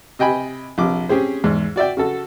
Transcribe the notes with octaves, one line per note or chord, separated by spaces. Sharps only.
C3 D#5 G5 G#5 B5
A#1 C3 D6
C4 C#4 G4 G#4 C5
E2 G#2
F#4 D5 E5 G5
C#3 F#4 A4